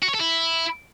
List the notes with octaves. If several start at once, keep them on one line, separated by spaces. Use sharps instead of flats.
F#4
C#5
A4
E4